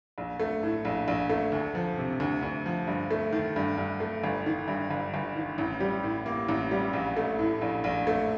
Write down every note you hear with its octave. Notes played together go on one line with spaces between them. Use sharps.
A#1
A3
A2
A#1
A#1
A3
D2
F3
C3
D2
D2
F3
G2
A3
D#3
G2
G2
A3
G1
D#3
G2
G1
G1
D#3
A1
G3
A2
A#3
A1
G3
A#1
A3
A2
A#1
A#1
A3